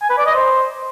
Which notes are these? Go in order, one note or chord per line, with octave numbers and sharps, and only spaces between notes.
G#5
B4
D5
D#5
C5